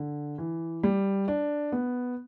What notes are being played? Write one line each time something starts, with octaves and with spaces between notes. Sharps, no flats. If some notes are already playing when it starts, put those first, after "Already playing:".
Already playing: D3
E3
G3
D4
B3